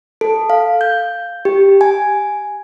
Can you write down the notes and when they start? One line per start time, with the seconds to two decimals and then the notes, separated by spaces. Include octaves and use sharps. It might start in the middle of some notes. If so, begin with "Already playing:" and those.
0.21 A4
0.50 F5
0.81 G6
1.45 G4
1.81 G#5